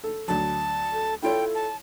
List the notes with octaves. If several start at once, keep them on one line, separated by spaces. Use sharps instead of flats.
A4
D2 F#3 A5
A4
E4 F4 A4 C#5 G5
A5